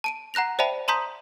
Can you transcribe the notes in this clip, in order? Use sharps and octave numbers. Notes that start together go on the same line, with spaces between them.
A5 D7 D#7
F#5 A#5 F#6 A#6 F7
C5 D5 E5 G5 A5 B5
A5 A#5 C6 D#6 G6 B6